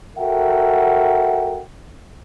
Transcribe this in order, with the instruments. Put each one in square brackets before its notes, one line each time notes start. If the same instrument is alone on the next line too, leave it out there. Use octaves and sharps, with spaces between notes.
[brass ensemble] F#4 A4 A#4 E5 F#5 G5